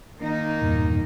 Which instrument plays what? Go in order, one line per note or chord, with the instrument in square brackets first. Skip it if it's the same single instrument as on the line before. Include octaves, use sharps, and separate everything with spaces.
[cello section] D#3 A#3 D#4
[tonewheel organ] E2 G2 A#2